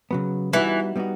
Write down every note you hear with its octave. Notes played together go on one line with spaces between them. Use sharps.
C#3 F#3 B3
E3 G3 B3 D#4 F#4
G3 B3 D#4 F#4